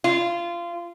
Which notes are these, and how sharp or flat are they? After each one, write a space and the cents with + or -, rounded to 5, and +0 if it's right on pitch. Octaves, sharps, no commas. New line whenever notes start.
F4 -20